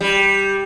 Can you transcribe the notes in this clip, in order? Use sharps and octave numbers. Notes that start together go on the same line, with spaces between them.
G3